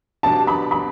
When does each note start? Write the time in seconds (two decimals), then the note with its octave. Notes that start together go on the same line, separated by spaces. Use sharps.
0.23 B2 B3 D4 G4 A5
0.47 B5
0.71 B5